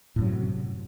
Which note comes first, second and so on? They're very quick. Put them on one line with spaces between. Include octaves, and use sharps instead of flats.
A2 F#2 F#3 C3